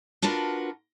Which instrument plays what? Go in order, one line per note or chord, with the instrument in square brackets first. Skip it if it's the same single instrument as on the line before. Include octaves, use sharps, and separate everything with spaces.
[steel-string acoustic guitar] D4 F4 F#4 A#4 B4